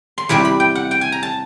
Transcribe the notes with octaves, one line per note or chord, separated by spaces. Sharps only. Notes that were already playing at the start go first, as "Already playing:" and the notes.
C6
E2 C3 E3 G3 B5
B5
G5
F#5
G5
G#5
A#5
A5